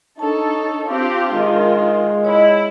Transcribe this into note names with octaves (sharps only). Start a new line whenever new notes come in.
D4 D#4 A4 C#5 A5
C4 F4 G4
D#3 G#3
E4 C#5 D#5